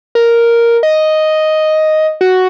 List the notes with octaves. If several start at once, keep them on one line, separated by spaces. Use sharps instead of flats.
A#4
D#5
F#4